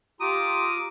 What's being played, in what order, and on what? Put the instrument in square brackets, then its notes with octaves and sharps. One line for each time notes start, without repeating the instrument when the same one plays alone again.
[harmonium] F4 A#5 [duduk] G4 [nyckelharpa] D6 [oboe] D#6